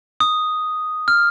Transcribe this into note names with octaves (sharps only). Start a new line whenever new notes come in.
D#6
F6